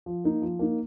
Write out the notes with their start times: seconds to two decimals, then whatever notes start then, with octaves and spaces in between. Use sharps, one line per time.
0.06 F3
0.24 A#3 D#4
0.42 F3
0.59 A#3 D#4